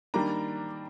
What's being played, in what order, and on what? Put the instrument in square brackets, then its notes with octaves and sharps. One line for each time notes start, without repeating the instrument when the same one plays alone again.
[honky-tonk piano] D#3 G3 A#3 D4 A#5